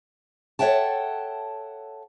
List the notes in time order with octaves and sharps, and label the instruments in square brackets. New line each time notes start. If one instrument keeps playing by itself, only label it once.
[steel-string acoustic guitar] A4 C#5 E5 F#5 G5 A5